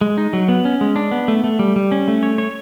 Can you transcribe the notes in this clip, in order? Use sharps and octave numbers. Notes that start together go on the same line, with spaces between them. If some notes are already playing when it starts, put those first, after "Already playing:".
G#3
D#4
F#3
B3
C#4
G#3
D4
B3
A3
A3
G3
G3
C#4
A3
C#5
C#5